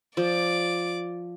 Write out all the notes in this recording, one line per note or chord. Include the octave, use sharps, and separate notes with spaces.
F3 D5 D6